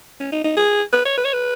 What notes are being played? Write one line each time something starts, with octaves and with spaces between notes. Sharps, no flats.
C#4
D#4
D#4
G#4
B4
C#5
B4
C#5
B4